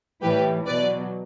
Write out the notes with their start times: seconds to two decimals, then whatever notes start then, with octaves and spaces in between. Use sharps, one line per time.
0.22 A2 E3 G3 G4 B4
0.66 B2 F#3 B4 D5